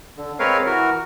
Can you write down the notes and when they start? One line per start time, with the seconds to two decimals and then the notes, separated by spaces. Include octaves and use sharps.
0.17 D3
0.39 G#3 C4 A#4 B4 C#5 F5
0.66 E3 F#4 A#4